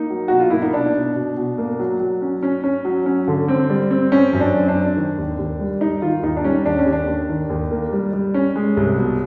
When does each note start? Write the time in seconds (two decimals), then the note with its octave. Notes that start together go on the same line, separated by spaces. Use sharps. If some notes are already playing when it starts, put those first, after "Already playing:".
Already playing: A#3 D#4
0.10 F#3
0.28 B2 F#4
0.39 F4
0.50 A#3 E4
0.62 D#4
0.73 B2 D4
0.95 B2
1.16 B2
1.37 B2
1.58 A#3
1.79 F#3
2.00 F#3
2.22 C#4
2.43 C#4
2.64 C#4
2.85 F#3
3.06 C#4
3.28 D3
3.48 C4
3.69 G3
3.91 C4
4.12 C4 C#4
4.33 F#2
4.40 D4
4.54 C4
4.68 D4
4.75 C4
4.96 D#3
5.18 D#2
5.39 D#2
5.60 G3
5.81 G3 D#4
6.02 D#3 F4
6.23 D#2 D#4
6.37 D4
6.44 G3 C#4
6.65 D#2 D4
6.79 C#4
6.86 D#2
6.92 D4
7.08 D#2
7.29 D#3
7.50 D#2
7.71 A#3
7.93 G3
8.13 G3
8.34 C#4
8.56 G#3
8.77 C2
8.98 B2